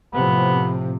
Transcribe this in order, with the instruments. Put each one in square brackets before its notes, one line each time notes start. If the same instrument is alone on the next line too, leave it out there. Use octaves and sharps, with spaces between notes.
[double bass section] A2 C3 F3 [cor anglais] B3